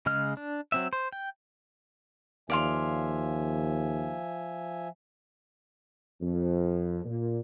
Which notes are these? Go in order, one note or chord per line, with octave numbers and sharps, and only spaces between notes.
C#3 G#3 D#5 F6
D4
F#3 C4 E5
C5
G5
D#2 F3 D5 E5 F5 G#5 C6
F2
A#2